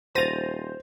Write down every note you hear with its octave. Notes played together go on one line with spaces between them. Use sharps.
D#1 C5 A6 A#6 D#7 F7